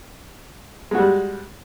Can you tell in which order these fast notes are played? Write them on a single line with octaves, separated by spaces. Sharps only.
G#3 F#4 G3